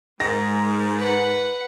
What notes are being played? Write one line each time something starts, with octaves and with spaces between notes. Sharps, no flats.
G#2 G#3 A#4 A#6
B4 F#5